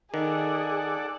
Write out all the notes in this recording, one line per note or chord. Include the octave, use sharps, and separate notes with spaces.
D#3 G#4 A4 D5 F#5